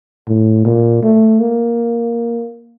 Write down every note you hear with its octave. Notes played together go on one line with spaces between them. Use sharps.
A2
A#2
A3
A#3